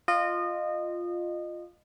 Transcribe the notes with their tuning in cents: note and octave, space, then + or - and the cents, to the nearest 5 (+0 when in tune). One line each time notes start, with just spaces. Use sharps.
F4 +0 D#5 -25